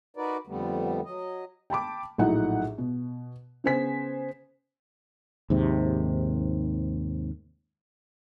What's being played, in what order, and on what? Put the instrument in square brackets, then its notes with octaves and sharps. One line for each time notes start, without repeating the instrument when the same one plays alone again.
[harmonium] D#4 F#4 A#4 B4 D5
F2 D3 G3 A3 B3
F#3 D#5
[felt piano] G5 A5 B5 D6
A#1 A2 F#3 D#4 E4 F#5
B2
C#3 B3 C5 G#5 B6
[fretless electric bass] D#2 G#2 C3